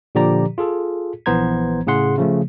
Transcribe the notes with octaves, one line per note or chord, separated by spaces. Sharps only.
A#2 D3 F3 G4 D5 A#5
F4 G#4 A4
A#1 E3 B3 C5 A#5 G#6
A2 C#3 G#4 F#5 C6
C#3 F3 A3